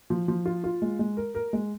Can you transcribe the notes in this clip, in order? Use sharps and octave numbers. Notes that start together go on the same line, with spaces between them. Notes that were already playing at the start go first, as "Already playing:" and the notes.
F3
F3
F4
F4
G#3
G#3
A#4
A#4
G#3